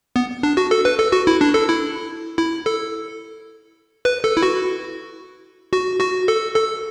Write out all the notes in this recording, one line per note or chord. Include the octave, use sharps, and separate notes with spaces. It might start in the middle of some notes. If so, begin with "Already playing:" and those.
B3
D4
F#4
A4
B4
A4
F#4
E4
D4
A4
E4
E4
A4
B4
A4
E4
F#4
F#4
F#4
A4
A4